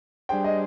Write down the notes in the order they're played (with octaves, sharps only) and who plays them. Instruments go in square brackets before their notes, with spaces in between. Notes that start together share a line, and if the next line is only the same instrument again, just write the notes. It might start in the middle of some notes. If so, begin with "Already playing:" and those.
[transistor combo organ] G3 D4 G#4 C5 [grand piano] G5
[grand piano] D#5